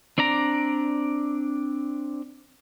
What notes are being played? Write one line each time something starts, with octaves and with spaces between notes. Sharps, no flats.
C4 D4 D5 A#5